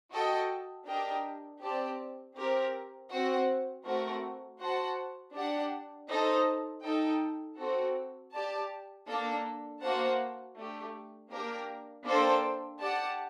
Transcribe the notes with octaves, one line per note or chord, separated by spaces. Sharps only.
F#4 A4 D#5 G5
D4 G4 A#4 D#5 G5
C4 G4 D5 A5
C4 G4 A#4
C4 F#4 C5 F#5
A3 C4 F#4 A#4
F#4 C5 F#5 A5
D4 G4 D5 F#5
D#4 A4 C5 D#5
D#4 A4 D#5 G5
C4 F#4 A4
G4 D5 A5
A#3 D4 A4
A#3 F#4 C5 F#5 A5
A3 D4 G4
A#3 D4 G4 A#4
A#3 D4 A4 C5 G5
G4 D5 F#5 A5